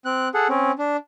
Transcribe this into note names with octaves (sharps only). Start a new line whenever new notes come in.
C4 F#6
G#4 A4 F#5
C4 C#4
D4